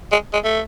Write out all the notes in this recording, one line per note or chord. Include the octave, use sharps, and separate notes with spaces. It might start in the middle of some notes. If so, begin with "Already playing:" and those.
G#3
G#3
A3